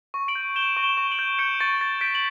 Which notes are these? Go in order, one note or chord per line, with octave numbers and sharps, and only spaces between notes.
C#6
D7 F#7
G6
G6 E7 G7
C#6
E7 G7
C#6
D7 F#7
G6
G6 C#7 E7
C#6 A6 C#7
C#6 A6
G6 B6 D7
F#7